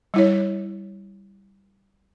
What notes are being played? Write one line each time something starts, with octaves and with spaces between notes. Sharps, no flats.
G3 E4 C#5